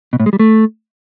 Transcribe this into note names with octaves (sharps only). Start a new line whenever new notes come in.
B2
A2
G#3
G3
A3